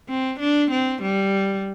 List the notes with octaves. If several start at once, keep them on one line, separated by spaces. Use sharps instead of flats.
C4
D4
C4
G3